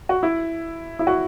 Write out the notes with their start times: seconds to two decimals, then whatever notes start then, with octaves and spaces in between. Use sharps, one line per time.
0.09 F#4
0.23 E4
0.99 E4
1.07 F#4